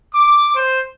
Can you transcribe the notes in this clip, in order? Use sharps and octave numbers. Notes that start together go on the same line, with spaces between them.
D6
C5